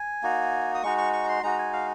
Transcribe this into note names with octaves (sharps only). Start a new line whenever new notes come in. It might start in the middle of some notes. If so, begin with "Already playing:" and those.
Already playing: G#5
A#3 D#4 F#4
D#6
G#3 D#4 F#4 C#6
C#6
C#6
A#5
C6
G#3 D#4 F#4 A#5
G#5
F5